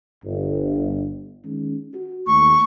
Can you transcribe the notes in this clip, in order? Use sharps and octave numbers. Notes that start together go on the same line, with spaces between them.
G1
D#3 G#3 C#4
F#4
D#2 A3 C#6